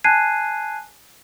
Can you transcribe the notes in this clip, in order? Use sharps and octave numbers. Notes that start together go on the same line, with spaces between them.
G#5 A5 F#6 G#6 C7 D#7